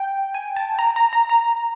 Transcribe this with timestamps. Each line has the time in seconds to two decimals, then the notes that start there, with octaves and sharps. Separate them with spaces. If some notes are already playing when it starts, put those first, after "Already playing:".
Already playing: G5
0.34 G#5
0.56 A5
0.79 A#5
0.96 A#5
1.13 A#5
1.29 A#5